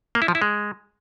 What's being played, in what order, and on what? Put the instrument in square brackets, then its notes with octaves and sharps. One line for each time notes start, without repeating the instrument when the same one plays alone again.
[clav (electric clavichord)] A#3
E4
F3
E4
G#3